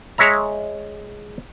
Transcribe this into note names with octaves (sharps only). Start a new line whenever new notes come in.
G#3 C#5 E5 A#5